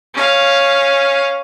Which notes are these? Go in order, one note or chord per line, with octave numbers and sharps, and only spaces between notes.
C#4 F5